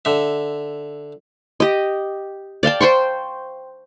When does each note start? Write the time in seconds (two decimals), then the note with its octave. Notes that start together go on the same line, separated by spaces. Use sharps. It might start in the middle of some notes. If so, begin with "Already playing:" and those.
0.05 D3 E5
1.60 G4 D#5
2.63 D5 F5 G5 A5
2.80 C5 G5 C6 C#6